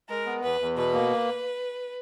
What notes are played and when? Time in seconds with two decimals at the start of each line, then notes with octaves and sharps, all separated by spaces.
0.09 G#3 A#4
0.26 B3
0.43 E2 B4
0.61 E2
0.77 B2 B4
0.94 A#3